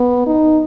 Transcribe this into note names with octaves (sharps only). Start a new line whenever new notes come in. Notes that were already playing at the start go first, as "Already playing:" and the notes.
Already playing: B3
D#4